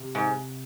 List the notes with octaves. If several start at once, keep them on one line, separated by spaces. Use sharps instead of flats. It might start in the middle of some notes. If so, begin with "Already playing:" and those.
Already playing: C3
G#2